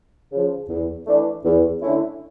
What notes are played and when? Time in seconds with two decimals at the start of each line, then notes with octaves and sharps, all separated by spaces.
0.31 C#3 F3
0.68 E2
1.06 E3 A3 D4
1.43 E2
1.81 D3 A3 C#4 E4